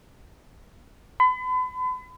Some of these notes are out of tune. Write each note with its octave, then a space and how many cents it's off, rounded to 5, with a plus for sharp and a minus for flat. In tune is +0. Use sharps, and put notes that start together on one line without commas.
B5 +40